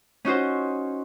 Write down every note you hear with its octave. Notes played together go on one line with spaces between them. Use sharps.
C#4 D#4 F#4 C5